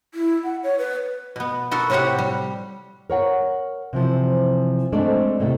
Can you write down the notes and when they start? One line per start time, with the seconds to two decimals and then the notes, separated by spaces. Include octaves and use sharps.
0.14 E4
0.44 F#5
0.63 C#5
0.78 B4
1.36 B2 B3
1.71 B3 F#4 A4 A#4
1.90 A2 C3 C4 F#4 G4 F#5
2.19 G3
3.10 A#4 C#5 F#5
3.93 C3 E3 F3
4.92 G#3 A3 C4 D4 D5
5.39 D#2 A2 C3 A3